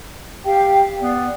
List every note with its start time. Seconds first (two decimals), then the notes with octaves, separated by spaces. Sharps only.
0.45 G4 F5 G5
1.01 B3 D5